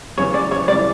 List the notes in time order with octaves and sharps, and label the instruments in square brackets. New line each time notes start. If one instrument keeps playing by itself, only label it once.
[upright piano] E2 C#3 F#3 B3 [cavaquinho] C#5
[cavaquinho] D5
C#5
[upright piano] C#2 C#3 G3 C#4 E4 [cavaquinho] D5